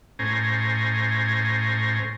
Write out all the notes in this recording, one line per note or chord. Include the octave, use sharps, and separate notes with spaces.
A2 C#4 C5 G#5 A#5